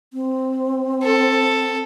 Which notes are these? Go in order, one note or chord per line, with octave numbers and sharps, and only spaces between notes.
C4
A4